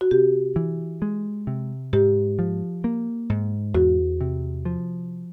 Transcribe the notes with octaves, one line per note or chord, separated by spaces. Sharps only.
F#4
C3 G4
E3
G#3
C3
G#2 G4
F3
A#3
G#2
E2 F#4
C3
F3